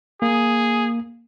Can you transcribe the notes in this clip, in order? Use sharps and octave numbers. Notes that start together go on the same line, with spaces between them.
A#3 G#4